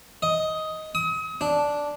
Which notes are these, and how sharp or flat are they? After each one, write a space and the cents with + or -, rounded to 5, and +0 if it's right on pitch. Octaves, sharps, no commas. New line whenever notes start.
D#5 +10
D#6 +35
D4 -5